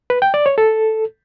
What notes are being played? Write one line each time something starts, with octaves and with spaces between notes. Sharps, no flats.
B4
G5
D5
C#5
A4